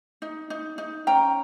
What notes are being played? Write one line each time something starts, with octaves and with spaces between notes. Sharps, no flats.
D#4
D#4
D#4
C#4 G5 A#5